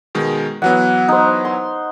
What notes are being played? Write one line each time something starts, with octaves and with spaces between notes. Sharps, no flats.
B2 D#3 G#3
E3 F#3 B3 F#5
D#4 C5
C6